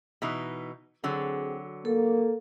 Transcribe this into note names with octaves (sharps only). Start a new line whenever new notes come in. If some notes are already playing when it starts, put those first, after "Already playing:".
B2 E3 D#4
D3 F#3 C4 F#4 G#4
A#3 A4